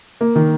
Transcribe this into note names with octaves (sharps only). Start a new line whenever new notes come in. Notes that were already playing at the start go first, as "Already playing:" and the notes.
A#3
D#3